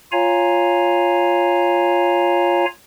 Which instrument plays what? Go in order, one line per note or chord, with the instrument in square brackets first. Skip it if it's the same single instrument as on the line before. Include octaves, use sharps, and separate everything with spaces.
[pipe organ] F4 C#5 F5 G#5 A#5